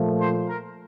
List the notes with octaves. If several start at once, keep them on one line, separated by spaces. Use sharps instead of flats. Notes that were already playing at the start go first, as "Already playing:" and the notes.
Already playing: A#2 F3 A3
C5
A#4